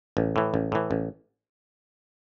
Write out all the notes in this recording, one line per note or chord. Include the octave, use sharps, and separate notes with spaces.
A1
A2 E3
A1
A2 E3
A1